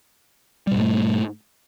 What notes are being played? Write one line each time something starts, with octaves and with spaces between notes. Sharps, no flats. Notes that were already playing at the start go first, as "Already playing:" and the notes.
G#2 B2 G3 A3